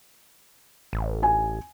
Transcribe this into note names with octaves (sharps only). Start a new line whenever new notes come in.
A1
G#5